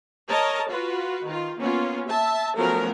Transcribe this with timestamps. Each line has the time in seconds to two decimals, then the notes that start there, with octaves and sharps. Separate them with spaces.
0.29 A#4 C#5 D#5 A5
0.69 F4 F#4 B4
1.24 D#3 F4
1.58 A#3 B3 C#4 F4
2.08 E5 A5
2.57 F3 F#3 A3 B3 C#4 A#4